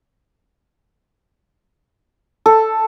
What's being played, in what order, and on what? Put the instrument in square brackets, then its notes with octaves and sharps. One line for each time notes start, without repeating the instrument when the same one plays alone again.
[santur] A4